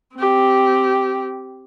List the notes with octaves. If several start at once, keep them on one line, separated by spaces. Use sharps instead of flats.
C4 G4